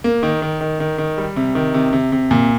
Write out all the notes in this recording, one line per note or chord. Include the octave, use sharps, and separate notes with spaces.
A#3
D#3
D#3
D#3
D#3
D#3
G3
C3
D#3
C3
C3
C3
A#2